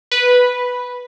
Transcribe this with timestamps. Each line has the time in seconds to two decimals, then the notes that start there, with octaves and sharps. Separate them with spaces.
0.12 B4